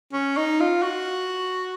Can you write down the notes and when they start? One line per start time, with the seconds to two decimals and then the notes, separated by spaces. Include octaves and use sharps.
0.13 C#4
0.37 D#4
0.60 F4
0.83 F#4